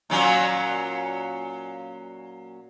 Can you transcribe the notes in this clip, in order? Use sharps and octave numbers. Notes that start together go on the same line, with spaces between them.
A#2 F#3 C#4